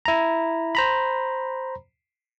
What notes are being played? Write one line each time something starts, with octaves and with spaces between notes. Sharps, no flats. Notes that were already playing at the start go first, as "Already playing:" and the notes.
E4 A#5
C5 A#5 B5